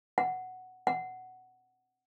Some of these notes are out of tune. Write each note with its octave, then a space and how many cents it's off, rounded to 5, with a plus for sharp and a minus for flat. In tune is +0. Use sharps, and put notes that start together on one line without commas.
F#5 +0
F#5 +5